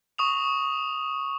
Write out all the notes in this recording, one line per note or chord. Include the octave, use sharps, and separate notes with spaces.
C#6 D#6 F7